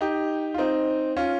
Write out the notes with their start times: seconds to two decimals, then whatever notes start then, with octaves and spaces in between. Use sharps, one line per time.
0.01 D#4 G4
0.54 F4
0.58 C4 D#4
1.17 C#4 F4